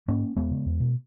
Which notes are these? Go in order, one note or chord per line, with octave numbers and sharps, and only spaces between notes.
G#2 A#3 C#4
E2 G#3 B3
C#3
E2
B2